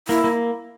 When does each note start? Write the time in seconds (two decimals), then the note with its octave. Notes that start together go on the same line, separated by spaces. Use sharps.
0.08 A#3 E4
0.24 A#3